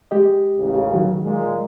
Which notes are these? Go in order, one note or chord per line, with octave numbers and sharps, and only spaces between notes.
G#3 G4 D#5
A1 D#2 C#3
D#3 F#3
A#2 G#3